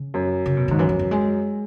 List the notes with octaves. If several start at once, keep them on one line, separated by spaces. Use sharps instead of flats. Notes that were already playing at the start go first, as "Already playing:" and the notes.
Already playing: C#3
F#2
C#3
B2
G#2 D#3
F#2 E3
E3
F#3
G#3